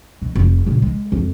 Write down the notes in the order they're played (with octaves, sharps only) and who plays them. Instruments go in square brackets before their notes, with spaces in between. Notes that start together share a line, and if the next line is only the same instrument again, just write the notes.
[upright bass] B2
F1
A#2 C#3
G#3
F2